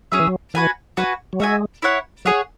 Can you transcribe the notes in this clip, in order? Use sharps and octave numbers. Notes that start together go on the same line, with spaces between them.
F#3 C#4 G#4 E5
E3
F#3
E3 F#4 B4 G#5
F#3 F#4 B4 G#5
F#3
G#3 F#4 E5 G#5
E4 C#5 F#5
F#3 G#4 C#5 F#5